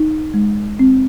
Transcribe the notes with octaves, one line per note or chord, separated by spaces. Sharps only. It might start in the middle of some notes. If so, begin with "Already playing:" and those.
Already playing: D#4
G#3
C4